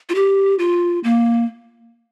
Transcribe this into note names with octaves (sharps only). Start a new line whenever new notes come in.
F4
G4
F4
A#3